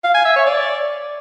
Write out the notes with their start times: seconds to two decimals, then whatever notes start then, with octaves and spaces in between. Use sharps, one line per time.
0.04 F5
0.15 G#5
0.25 E5
0.36 C#5
0.47 D5